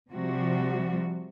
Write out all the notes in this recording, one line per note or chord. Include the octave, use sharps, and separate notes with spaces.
C3 F3 G3 F#4